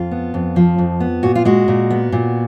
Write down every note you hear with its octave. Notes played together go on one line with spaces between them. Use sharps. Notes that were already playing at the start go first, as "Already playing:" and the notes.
Already playing: F2 F4
B3
F2
F3
F2
B3
A#2 F#4
F4
G#3 F#4
A#2
B3
A#2